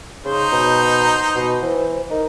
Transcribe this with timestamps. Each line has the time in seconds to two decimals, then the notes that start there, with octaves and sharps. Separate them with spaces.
0.25 C#3 D#4 C5
0.52 B2 A#5
1.36 B2
1.62 E3 C5
2.11 D#4 A#4